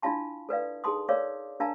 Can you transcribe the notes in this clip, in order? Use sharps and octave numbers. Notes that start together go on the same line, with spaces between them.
D4 E4 F4 F5 A5 C6
A4 B4 D5 F5
D#4 G#4 A4 A5 C6 D#6
A#4 C#5 D5 F5 D6
D4 A#4 F5 A5 A#5